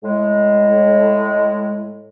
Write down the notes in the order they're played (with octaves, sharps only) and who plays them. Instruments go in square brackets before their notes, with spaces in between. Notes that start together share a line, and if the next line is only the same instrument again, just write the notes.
[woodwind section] A2 G#3